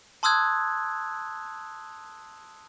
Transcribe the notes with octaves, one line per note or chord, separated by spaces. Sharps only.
A5 C6 D#6 E6 F#6 G#6